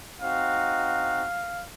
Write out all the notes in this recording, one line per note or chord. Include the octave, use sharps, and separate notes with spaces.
C4 D#4 F#4 F5